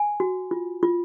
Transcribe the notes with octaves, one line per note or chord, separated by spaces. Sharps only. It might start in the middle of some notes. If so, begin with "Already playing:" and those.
Already playing: G#5
F#4
F4
F4